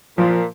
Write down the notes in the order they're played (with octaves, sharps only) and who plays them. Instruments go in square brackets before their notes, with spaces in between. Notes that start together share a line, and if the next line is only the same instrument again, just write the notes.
[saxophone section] A#2 [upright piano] F3